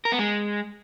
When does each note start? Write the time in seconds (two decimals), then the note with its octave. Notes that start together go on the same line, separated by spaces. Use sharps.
0.05 A#4
0.12 B3
0.19 G#3